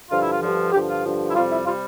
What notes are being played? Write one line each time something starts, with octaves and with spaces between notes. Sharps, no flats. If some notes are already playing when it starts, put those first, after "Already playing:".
G2 D3 F3 F4
E4
F4
G2 D3 F3
G2 D3 F3 G4
F4
G2 D3 F3
E4
F2 C3 G3 F4
E4
C3 G3 F4